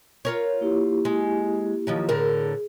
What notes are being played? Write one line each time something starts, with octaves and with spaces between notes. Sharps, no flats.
F4 A#4 C#5
A#3 E4 G4
G#3
D#3 F3 F#3
A2 D3 G#4 A#4